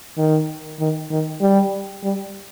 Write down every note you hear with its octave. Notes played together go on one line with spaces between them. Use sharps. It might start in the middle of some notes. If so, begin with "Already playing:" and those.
D#3
D#3
D#3
G3
G3